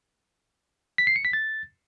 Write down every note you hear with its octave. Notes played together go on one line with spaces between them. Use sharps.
B6
C7
C#7
B6
A6